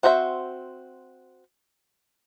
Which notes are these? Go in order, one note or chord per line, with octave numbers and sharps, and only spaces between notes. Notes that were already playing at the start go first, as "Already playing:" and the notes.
C4 F#4 C5 D#5 E5